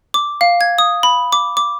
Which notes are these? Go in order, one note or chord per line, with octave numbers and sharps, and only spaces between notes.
D6
F5
G#6
D#6
B5
D6
D6